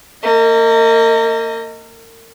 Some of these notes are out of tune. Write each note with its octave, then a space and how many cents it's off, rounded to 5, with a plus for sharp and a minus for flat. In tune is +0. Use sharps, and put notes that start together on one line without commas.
A#3 -35 D#5 +15